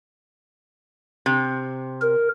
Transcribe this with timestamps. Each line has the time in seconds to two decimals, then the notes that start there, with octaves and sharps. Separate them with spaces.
1.26 C3
2.01 A#4